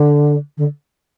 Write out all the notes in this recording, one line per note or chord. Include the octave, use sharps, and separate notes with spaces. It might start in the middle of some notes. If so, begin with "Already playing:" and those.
Already playing: D3
D3